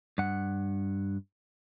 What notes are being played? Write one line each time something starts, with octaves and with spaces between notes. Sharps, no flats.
G2 F#5